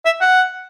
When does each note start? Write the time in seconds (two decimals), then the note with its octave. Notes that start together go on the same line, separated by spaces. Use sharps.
0.06 E5
0.21 F#5